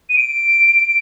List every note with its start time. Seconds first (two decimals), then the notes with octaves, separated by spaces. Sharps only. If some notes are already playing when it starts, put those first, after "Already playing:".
0.09 D#7
0.16 D7